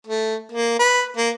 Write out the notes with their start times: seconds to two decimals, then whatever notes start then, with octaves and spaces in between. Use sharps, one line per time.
0.07 A3
0.52 A#3
0.79 B4
1.17 A#3